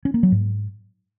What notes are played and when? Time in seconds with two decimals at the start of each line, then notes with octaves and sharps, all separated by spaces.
0.05 C#4
0.14 A#3
0.23 F#3
0.32 G#2